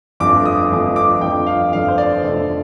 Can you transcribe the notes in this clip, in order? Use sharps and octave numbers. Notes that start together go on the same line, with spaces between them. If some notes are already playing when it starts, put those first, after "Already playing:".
G1 F2 D3 A3 D6
D#6
G1 F2 D3 A3
D6
G1 F2 D3 A3 G5
F5
G1 F2 D3 A3 F5
C5
D5
F1 F2 D3 A3